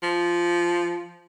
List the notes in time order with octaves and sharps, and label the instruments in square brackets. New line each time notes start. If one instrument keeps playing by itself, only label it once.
[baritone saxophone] F3